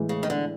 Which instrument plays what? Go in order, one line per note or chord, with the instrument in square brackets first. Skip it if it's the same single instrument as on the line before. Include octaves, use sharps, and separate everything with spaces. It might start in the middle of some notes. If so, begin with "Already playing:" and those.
Already playing: [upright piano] A2 E3 G#3
[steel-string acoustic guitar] C#3
D#3
D3